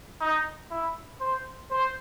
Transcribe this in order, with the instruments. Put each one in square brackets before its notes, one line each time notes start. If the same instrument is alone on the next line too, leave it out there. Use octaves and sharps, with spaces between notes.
[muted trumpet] D#4
E4
C5
C5